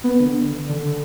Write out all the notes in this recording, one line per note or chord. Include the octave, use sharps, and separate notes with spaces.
B3
D3
D3